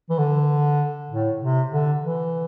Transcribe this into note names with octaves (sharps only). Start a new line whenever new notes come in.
E3
D3
A2
C3
D3
E3